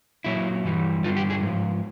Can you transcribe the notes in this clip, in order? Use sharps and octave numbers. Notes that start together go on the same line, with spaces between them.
A#2 F#3 E4
G2 E3 G3
G2 D3 G3 F4
G4
G#4
G#2 F3